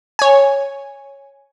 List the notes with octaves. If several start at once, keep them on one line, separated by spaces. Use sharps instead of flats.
C#5 G#5